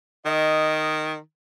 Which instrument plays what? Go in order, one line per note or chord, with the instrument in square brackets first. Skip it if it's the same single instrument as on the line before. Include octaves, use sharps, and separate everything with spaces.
[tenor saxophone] D#3 [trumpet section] D#5